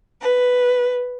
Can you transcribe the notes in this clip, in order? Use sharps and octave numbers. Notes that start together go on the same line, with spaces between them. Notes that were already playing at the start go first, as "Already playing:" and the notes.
B4